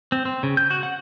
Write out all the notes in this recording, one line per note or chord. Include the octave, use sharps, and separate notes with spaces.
C4
C4
C#3
G6
F#4
F#5